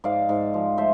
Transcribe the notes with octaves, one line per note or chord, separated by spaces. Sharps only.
G#2 D5 F5
G#2
F3
A3 C5 E5